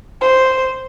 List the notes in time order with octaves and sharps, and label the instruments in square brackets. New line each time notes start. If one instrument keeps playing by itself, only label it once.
[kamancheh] C5